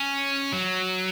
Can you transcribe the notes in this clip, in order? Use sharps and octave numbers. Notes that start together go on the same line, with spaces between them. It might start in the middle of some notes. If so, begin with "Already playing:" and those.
Already playing: C#4
F#3